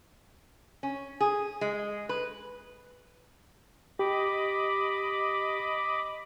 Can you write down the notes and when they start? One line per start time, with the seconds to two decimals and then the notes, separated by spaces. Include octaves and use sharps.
0.83 C#4
1.21 G#4
1.61 G#3
2.09 B4
3.99 G4 D#5 B5 D6